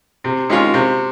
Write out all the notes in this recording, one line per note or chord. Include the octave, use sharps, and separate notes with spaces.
C3
D#3 G#3 C#4 F4
C3